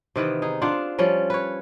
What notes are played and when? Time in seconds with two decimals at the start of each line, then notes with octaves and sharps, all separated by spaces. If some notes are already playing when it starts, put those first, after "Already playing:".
0.16 C3 D#3 E3 B3
0.42 D#4 G#4
0.62 D4 F4 C5 F#5
0.99 F3 G3 C#4 C#5
1.30 B4 C#5